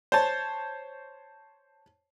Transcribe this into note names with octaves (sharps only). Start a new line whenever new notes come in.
C5 C#5 A5